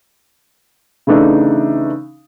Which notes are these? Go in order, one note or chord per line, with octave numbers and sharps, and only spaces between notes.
C#3 E3 A3 D4 D#4